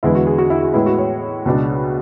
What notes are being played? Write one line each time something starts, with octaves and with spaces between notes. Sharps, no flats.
E2 D3 G#3 B3 E4
F#4
G#4
F#4
E4
F#4
A2 G#3 B3 E4
F#4
C#5
C#2 B2 G#3 D4